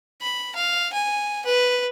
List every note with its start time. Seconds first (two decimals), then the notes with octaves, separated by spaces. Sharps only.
0.21 B5
0.55 F5
0.93 G#5
1.45 B4